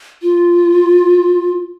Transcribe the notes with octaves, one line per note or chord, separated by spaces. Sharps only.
F4